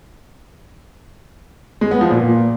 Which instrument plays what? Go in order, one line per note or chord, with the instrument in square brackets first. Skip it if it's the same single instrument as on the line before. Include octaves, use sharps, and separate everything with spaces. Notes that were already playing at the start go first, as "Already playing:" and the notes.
[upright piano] G#3
B3
F3
A#2